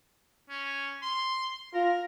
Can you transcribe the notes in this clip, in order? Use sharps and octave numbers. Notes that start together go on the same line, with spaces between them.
C#4
C6
F4 A#4